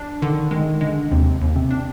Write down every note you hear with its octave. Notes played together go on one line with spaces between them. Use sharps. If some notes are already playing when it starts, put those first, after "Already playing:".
Already playing: D4
D3 D#3
D#3 G#3
D3 G#3
D#2 C3
D#2
C3
D4